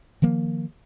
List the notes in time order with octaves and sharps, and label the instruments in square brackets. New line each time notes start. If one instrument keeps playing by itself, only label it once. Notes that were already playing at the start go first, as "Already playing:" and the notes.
[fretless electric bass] D#3 F3 A#3